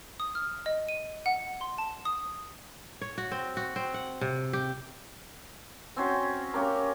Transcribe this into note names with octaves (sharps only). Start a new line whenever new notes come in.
D#6
F6
D#5
D#7
F#5
C6
A5
D#6
C#5
F#4
C4
F#4
C4
F#5
C3
G4
C4 C#4 F#4 C5
A#3 C#4 G4 A#4